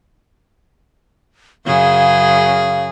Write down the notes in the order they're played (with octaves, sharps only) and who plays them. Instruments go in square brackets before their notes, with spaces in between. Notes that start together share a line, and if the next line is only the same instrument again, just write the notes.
[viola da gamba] F#2 C#3 G#4 [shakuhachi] F5